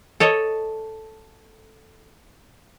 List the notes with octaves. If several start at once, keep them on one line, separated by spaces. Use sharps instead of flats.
A4 C#5 D#5